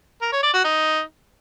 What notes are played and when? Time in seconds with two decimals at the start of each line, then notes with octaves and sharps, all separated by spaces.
0.22 A#4
0.32 C#5
0.43 D5
0.54 F#4
0.64 D#4